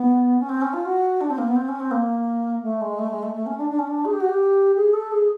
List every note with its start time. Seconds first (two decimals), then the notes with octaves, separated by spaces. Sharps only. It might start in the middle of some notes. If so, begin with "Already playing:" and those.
Already playing: B3
0.39 C#4
0.49 C4
0.61 C#4
0.73 F4
0.85 F#4
1.20 D4
1.29 C4
1.37 A#3
1.47 B3
1.55 C4
1.68 C#4
1.79 C4
1.91 A#3
2.62 A3
2.81 G#3
2.98 A3
3.10 G#3
3.22 A3
3.33 A3
3.46 C#4
3.57 D4
3.69 D4
3.78 C#4
3.87 D4
4.04 G#4
4.12 G4
4.20 F#4
4.28 G4
4.76 G#4
4.93 A4
5.11 G#4